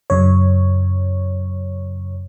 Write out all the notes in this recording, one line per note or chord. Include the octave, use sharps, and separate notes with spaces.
F#2 C#3 C#5